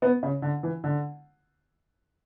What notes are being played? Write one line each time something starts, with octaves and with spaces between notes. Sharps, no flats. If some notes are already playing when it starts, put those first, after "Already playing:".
B3
C#3
D3
E3
D3